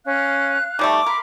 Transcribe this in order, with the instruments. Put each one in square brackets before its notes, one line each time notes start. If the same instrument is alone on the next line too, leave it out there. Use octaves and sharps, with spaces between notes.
[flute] C#4 [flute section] F5 F#6
[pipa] D#3 G3 A3 [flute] D6
[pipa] A#4 [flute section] B5 C6